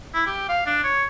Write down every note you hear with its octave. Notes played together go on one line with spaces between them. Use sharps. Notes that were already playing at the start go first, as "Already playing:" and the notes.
E4
G4
F5
D4
C#5